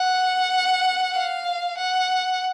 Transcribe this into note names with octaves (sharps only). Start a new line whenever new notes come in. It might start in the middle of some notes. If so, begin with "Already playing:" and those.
Already playing: F#5
F5
F#5